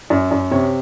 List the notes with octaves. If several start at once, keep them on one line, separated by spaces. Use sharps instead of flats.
F#2
F#2
C3 C#5